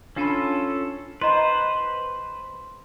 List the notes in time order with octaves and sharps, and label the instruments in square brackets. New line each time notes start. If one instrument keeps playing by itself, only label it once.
[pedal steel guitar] C#4 F4 A4 [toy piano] D4 A5 B5
[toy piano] E4 D#5 A#5 [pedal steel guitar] B4 C5 [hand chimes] C6